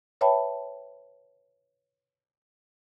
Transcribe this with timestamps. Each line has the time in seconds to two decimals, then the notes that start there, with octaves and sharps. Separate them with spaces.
0.21 B4 C#5 E5 G5 A5 B5